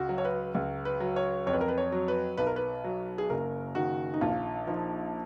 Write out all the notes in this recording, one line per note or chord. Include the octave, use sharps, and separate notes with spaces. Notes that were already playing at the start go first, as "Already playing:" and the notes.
Already playing: C#2 F#4
F#3
C#5
B4
C#2
B4
F#3
C#5
F2 C#5
B4
A#4
B4
C#5
F#3
B4
B1 B4
A#4
B4
F#3
G#4
F#1 A#4
D#3 F#4
D#4
A#1 F4
F3 D#4